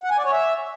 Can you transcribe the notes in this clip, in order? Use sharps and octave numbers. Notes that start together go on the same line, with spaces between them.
F#5
G#5
D5
C#5
E5